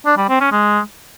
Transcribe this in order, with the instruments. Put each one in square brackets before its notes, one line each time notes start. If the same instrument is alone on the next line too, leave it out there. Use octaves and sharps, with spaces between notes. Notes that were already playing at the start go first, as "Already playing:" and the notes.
[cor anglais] D4
G3
C4
C#4
G#3